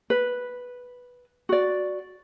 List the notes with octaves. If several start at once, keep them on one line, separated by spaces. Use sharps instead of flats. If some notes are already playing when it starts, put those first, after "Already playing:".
B4
F#4 D5